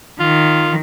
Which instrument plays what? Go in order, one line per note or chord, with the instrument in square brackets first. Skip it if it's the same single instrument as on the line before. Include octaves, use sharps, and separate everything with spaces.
[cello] D#3 [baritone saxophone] F4